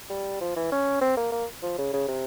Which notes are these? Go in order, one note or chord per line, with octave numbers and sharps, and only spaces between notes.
G3
F3
E3
C#4
C4
A#3
A#3
F3
C#3
C#3
C3